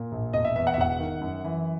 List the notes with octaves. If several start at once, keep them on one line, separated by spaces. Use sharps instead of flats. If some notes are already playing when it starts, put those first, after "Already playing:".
Already playing: A#2
A#1
E1 D#5
E5
E2 E5
F#5
E5
E1 F#5
D#3
F#2
E3